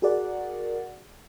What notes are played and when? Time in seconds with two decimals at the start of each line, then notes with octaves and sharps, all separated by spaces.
0.02 F#4 G#4 A#4 D5 F#5